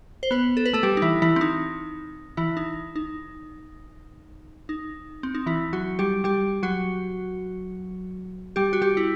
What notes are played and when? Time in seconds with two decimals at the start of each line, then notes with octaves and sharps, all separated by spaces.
0.23 C5
0.31 B3 B4
0.57 A4
0.65 B4
0.73 A3 A4
0.83 G3 G4
0.97 D#4
1.02 E3 E4
1.22 E3 E4
1.36 C4
1.41 D#4
2.37 E3 E4
2.57 D#4
2.96 D#4
4.69 D#4
5.23 C4
5.35 D#4
5.46 E3 E4
5.73 F#3 F#4
5.99 G3 G4
6.24 G3 G4
6.63 F#3 F#4
8.56 G3 G4
8.73 F#4
8.81 G3 G4
8.97 E4